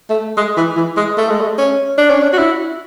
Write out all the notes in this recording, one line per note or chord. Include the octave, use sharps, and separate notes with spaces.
A3
G#3
E3
E3
G#3
A3
G#3
A3
C#4
D4
C#4
D4
F#4
E4